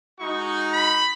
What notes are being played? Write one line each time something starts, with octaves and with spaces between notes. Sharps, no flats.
G#3 D#4 F#4 C#6
B5